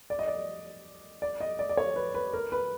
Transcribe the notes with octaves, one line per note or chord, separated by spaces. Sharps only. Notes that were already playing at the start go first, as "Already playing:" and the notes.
D5
D#5
D5
D5
D#5
D5
D5
C#5
B4
B4
A#4
B4